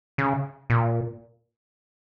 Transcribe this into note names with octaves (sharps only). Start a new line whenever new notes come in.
C#3
A#2